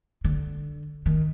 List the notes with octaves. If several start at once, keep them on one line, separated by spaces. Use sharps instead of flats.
D3
D#3